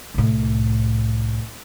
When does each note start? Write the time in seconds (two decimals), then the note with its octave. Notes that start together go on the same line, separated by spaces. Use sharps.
0.14 C2 A2